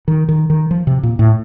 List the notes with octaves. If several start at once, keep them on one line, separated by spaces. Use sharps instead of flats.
D#3
D#3
D#3
F3
C3
A#2
A2